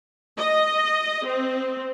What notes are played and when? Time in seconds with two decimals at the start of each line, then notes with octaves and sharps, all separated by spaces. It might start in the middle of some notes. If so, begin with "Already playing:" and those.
0.38 D#5
1.26 C4